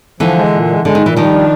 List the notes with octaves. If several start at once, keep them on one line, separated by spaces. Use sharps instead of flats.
D3 E3 F3
G#3
A#2
G#3
D3 G#3
D#3
A#2
E3
D#3 F3 G3
D4